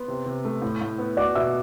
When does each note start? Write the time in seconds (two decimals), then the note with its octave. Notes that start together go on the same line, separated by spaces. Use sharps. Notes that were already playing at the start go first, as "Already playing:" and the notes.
Already playing: B3 C6
0.08 C3
0.26 C3
0.45 A3
0.62 A2
0.81 A2
0.98 B3
1.17 F#4 D5 D6
1.35 B2 E5 E6